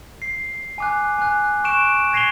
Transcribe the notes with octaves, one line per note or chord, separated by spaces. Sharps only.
C7
G#5 D6 F#6
G#5 F#6
C#6 F#6 D7 E7
G#6 A#6 C7 D#7 F7 G7